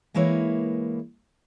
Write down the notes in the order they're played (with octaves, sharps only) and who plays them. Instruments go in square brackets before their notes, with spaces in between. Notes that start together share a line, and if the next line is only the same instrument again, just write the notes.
[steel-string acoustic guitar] E3 G#3 A#3 E4 B4 C#5